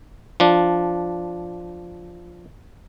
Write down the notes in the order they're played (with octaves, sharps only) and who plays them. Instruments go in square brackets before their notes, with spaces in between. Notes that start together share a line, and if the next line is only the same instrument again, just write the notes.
[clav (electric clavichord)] F3 D4